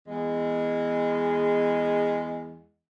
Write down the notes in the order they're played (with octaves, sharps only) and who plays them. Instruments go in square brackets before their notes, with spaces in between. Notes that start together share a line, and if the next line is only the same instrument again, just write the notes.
[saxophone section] E2 G#3